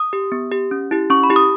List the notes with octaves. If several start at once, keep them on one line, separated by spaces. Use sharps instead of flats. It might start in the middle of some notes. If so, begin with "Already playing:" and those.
Already playing: D#6
G4
B3
G4
C#4
E4 G4
C#4 C#6
B5
E4 G4
D#6